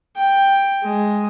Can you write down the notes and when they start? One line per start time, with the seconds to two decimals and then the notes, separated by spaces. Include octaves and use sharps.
0.16 G5
0.83 G#3